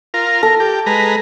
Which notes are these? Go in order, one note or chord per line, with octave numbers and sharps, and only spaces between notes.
F4 A#4
A4 A#4
G4
G#3 B4 A#5